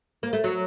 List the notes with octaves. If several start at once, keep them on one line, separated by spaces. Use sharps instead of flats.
A#3
A3
F#3